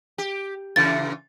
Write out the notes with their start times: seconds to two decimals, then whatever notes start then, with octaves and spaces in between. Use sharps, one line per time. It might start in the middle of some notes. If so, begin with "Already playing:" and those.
0.18 G4
0.76 A#2 C#3 E3 A6